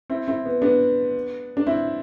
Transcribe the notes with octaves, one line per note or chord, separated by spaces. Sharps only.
C4 E4
C4 E4
B3
B3 D4
D4
C4 E4